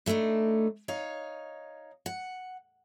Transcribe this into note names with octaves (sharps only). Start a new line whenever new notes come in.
A2 A3 C4 D4 D#4
D#4 C#5 F5
F#5